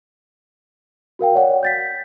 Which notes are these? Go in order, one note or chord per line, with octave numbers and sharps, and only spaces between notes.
F#4 A#4 F5 G5
C#5 D5 F#5
G6 A6 B6